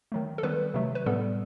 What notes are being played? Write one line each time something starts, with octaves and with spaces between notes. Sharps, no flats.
D#3 F#3 A3
A4
D#3 G3 B3 B4
C3 F#3 A3
B4
A2 G3 B3 A4